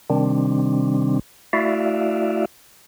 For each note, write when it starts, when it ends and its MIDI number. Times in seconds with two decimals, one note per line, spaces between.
0.10 1.19 48
0.10 1.19 51
0.10 1.19 55
0.10 1.19 60
0.10 1.19 62
1.53 2.45 57
1.53 2.45 64
1.53 2.45 66
1.53 2.45 74
1.53 2.45 76
1.53 2.45 77